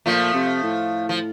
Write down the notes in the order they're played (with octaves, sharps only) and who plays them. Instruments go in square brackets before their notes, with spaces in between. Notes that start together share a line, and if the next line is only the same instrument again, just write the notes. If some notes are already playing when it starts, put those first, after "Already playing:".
[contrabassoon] A#2 [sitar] F3 A3
[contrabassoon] C3
A2
[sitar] F3